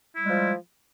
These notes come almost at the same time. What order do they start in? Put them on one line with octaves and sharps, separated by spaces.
E4 G3 G#3 F3